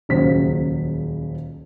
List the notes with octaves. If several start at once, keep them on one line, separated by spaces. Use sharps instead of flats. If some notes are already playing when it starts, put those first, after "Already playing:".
D#1 C#2 C#3 F#3 C5 B6